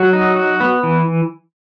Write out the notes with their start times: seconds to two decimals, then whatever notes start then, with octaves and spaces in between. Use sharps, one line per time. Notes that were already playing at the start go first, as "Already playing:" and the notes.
Already playing: F#3 F#4
0.13 D#4
0.36 F#4
0.60 B3
0.83 E3